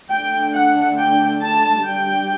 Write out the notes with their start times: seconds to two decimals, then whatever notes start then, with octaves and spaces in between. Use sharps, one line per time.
0.10 D3 A3 D4 G5
0.54 F#5
0.98 G5
1.42 A5
1.86 G3 D4 G5